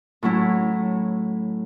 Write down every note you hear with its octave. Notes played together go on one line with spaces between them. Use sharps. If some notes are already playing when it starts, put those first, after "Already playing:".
A2 F#3 C#4 E4